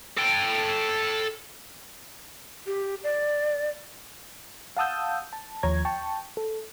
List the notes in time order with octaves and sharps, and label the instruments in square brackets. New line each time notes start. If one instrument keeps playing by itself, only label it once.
[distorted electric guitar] A4 G5
[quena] G4
D5
[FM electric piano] F5 F#5 A5 D#6 E6 G6
A5
D#2 F3 C#5 A#5 G#6
G5 A5 C#6
A4